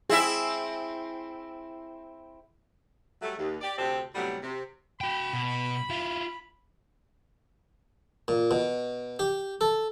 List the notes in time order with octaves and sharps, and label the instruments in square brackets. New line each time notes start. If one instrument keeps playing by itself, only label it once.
[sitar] C4 E4 E5 [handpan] G#4
[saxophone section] F#3 G3 A3
D#2
G4 D5
D2 C3 C4 G4 A4
A2 C3 F#3 G3 B3
C3
[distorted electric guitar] F#4 G5 [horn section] B5
[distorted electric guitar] B2
E4 F4
[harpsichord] A#2
B2
G4
A4